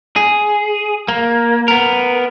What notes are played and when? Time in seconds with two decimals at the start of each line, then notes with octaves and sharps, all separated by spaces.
0.16 G#4
1.08 A#3
1.68 B3 A#4